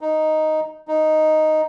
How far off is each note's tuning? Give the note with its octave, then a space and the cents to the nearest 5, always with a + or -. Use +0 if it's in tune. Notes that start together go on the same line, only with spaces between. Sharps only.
D#4 +0
D#4 +0